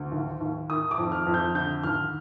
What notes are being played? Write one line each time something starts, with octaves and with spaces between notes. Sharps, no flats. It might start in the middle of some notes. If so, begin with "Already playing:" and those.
Already playing: D2 D3
D#2
D#2
D#3 D#6
D6
F2
F6
F2
G6
D3 G6
D#2 F6